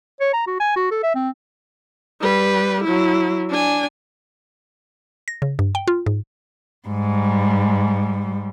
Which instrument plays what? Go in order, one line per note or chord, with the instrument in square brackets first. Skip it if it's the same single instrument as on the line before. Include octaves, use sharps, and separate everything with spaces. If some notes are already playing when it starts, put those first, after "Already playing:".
[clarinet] C#5
A#5
F#4
G#5
F#4
A4
E5
C4
[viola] G3 B4
F#3 E4
D4 G#5
[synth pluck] A#6
C#3
G2
G5
F4
G#2
[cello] G#2 G3